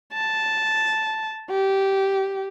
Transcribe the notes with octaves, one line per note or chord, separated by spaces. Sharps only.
A5
G4